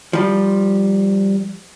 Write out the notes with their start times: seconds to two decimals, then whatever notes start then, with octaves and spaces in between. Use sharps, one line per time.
0.13 F3 G3